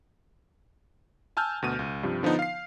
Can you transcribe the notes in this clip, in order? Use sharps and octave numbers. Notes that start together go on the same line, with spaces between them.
G#5 A5 E6 F6 G6
D2 B2 D#7
C#2
G2 C3 F3
D3 F3 B3 D#4
F5 C7